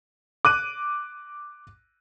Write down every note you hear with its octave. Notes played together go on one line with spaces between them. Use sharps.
D6 F#6 D#7